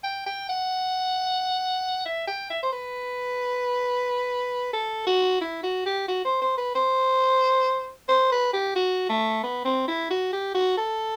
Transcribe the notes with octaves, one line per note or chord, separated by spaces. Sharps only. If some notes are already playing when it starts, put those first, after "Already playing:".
G5
G5
F#5
E5
G5
E5
C5
B4
A4
F#4
E4
F#4
G4
F#4
C5
C5
B4
C5
C5
B4
G4
F#4
A3
B3
C4
E4
F#4
G4
F#4
A4